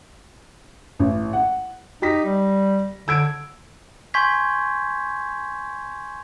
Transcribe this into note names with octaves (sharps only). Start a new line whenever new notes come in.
A1
F#5
D#4 G4 A#6 B6
G3
D3 E6 G#6 D7
G#5 C6 C#6 G6 G#6 B6